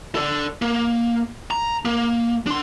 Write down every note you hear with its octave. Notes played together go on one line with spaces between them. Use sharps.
A4 D5
A#3
A#5
A#3
D4 C6